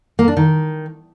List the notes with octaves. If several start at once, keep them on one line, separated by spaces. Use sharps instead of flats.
A#3
D4
D#3